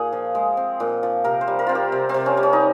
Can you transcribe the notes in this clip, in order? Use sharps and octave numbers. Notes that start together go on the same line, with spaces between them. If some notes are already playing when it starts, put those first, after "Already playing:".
Already playing: A#2 G#4
F3
G#3
C4
A#2
F3
C3 A#4
C5
G3
A#4
C4 F4
G4
C3
C4
C3
C#4
G3
C#4
D#4